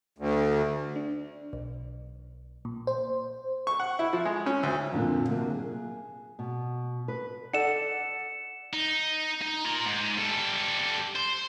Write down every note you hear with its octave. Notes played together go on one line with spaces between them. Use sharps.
D2
D4
B1
A#2
C5
C#6
F#5
E4
F3
G#3
C#4
D2
F2 A#2 D3 D#3 F3
C3 F#3 A#3 C4
G#4
B2
B4
A4 D5 F#5 C#7 E7
D#4
D#4
F4 A#5
G#2
G3 A4
C5